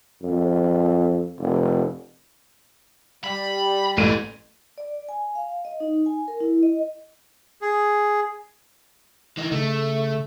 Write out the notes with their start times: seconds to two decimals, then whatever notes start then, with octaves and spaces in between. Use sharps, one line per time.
0.22 F2
1.39 F1
3.24 G3 B5
3.97 A1 A#2 D#7
4.78 D5
5.09 G#5
5.35 F5
5.65 D#5
5.80 D#4
6.06 G#5
6.28 A#4
6.40 E4
6.63 D#5
7.62 G#4
9.37 E3 D#4
9.52 C#3 A3